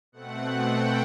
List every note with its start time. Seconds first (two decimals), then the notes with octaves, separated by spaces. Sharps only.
0.12 B2 A3 C4 F#5
0.70 G5